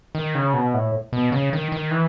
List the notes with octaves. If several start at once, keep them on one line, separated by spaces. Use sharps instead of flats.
D#3
C#3
B2
A2
B2
C#3
D#3
D#3
E3